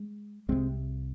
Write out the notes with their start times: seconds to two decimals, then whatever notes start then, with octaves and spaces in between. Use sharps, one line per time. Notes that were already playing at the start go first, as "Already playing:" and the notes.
Already playing: G#3
0.48 C2 C3 G#3 C4